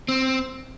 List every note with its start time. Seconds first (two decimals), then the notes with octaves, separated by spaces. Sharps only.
0.09 C4